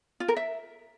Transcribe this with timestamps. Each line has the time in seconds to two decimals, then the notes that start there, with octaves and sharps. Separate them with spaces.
0.20 F4
0.28 A#4
0.37 E5